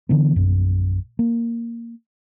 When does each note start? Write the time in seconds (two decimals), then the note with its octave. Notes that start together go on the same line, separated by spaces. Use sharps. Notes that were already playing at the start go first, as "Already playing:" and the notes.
0.09 D3 E3 B3
0.36 A#1 F#2
1.19 A#3